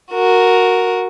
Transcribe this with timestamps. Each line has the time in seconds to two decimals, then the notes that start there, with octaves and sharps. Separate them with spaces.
0.12 F#4 A#4